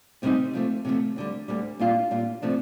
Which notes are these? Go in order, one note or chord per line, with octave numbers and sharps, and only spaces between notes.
D2 C3 G3 C4 D#4
C3 F3 A3
C3 F3 A3
D2 D3 G3
D2 D3 G3
A#2 G3 D4 F4
A#2 G3 D4 F4
C3 F3 A3 D4